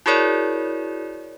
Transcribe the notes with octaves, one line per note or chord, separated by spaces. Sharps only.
E4 F#4 G#4 A#4 C#5 D5